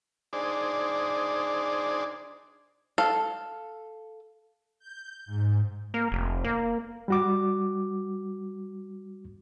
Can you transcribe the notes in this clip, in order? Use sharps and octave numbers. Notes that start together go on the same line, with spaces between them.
D4 D#4 G#4 C5 D5
A4 F5
G6
G#2
A#3
F1
A#3
G3 F#4 D6